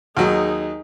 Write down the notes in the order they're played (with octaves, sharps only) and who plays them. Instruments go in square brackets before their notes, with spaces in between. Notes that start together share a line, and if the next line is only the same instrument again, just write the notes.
[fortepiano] D#2 F#3 [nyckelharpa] D#4 G#4